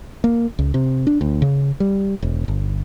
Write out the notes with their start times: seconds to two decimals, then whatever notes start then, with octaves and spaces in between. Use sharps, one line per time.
0.24 A#3
0.59 C#2
0.74 C3
1.07 D4
1.21 D2
1.42 C#3
1.80 G3
2.22 E1
2.48 G1